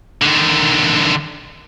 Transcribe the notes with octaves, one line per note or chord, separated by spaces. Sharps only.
D3 D#3